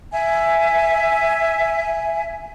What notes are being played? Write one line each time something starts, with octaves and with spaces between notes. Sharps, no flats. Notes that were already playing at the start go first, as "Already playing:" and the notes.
E5 G#5